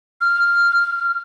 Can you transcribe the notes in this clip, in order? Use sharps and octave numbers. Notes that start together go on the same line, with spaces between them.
F6